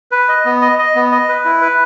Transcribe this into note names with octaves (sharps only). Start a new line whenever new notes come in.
B4
D#5
B3
D#5
D#5
B3
D#5
B4
E4
B4